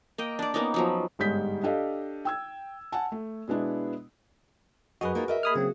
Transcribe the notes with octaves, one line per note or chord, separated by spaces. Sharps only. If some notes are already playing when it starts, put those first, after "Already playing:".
A#3 D#5 G5
D4 D5
A#3 B3 C#4 D#4
F3 F#3 B3
G1 G#2 G3 G#3 G6 B6
D4 G4 A4 D#5 F5
G5 E6 G#6
F#5 G#5 A5
A3
B2 G#3 B3 D4 E4
F#2 F#4 G#4 B4 D#5
A#3 D#4 F4
A#4 D#5 E5
A#3 G#4 B5 D#6 F6
C#3 F#3 C4 F#4